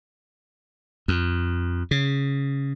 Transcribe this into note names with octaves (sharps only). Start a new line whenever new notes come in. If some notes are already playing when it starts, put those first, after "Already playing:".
F2
C#3